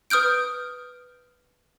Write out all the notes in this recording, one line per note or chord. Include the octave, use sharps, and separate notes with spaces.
B4 D#6 F6 G6 D7